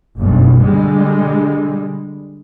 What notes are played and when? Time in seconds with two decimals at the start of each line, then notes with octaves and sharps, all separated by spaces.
0.17 F#1 B1 G2
0.65 D3 G3 G#3